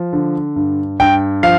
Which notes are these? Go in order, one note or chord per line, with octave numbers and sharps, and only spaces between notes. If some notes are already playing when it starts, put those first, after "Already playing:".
Already playing: F3
D3
G2
G2 G5
F3 F5